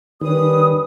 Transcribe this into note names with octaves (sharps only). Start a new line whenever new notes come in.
D#3 G3 C#4 B4 D#6